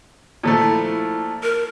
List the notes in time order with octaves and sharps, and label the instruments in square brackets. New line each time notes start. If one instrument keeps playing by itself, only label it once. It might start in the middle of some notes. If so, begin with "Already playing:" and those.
[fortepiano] A#2 F3 A3
[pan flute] E4
A#4